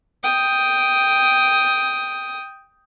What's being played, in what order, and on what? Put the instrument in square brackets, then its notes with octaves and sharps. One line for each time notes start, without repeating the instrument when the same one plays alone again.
[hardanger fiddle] G5 D#6